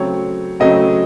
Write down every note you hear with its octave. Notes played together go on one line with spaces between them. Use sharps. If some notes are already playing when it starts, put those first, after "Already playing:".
Already playing: C#3 F#3 A3 C4 C#5
C#3 F#3 A3 C4 D#5